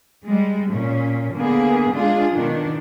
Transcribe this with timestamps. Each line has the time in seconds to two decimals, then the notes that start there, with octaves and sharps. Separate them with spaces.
0.23 G3 G#3
0.71 A#2 C#4
1.34 D3 A#3 B3 G#4
1.92 G#3 D4 F4 G#4
2.33 B2 D#3 D4